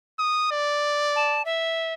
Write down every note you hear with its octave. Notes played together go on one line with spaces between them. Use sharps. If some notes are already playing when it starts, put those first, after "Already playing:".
D#6
D5
A5
E5